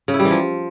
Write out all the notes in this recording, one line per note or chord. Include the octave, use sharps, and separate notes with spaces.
C#3
E4
G3
E3
F3